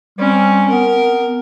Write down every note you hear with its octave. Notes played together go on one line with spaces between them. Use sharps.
G3 C4 C#4
B3 A#4